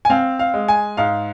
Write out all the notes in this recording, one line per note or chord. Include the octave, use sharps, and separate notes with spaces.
G#5
C4 F5
F5
G#3
G#5
G#2 F5